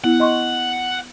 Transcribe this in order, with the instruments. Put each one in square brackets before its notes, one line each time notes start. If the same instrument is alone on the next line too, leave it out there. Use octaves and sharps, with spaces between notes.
[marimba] B3 E4 [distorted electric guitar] F#5
[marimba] D#5 C6 C#6